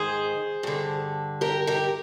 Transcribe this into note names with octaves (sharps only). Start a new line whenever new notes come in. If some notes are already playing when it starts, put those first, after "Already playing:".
Already playing: G#2 D#3 G#4 C5
G2 D3
G4 A#4
G4 A#4